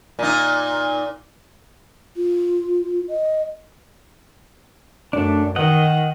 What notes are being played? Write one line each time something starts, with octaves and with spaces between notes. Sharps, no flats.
A#2 D#4
F4
D#5
F#2 A3 D4
D#3 D#5 F#5